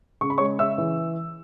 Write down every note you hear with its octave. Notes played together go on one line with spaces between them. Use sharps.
C#3 C#6
B5
G#3 C#5 C#6
C#3 E5 E6
E3